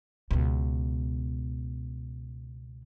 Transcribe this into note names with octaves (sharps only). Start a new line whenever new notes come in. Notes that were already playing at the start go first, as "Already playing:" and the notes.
C#2 B2